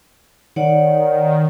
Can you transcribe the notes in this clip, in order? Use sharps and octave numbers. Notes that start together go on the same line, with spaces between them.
D#3 C#5 D5 F#5